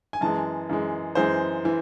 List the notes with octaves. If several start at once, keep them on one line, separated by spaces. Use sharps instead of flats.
G#5
F#2 E3 G#3 A5
F#2 E3 G#3
F#2 E3 G#3 C5
E3